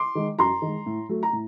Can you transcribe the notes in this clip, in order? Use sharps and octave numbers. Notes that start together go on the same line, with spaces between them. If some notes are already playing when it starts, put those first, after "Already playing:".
Already playing: C6 D6
D#3 G#3
F#2 A#5 C6
D#3 G#3
A2
F#3 A3
A#5
A2